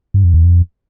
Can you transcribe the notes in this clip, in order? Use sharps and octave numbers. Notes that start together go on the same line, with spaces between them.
G2
F2
E2
F2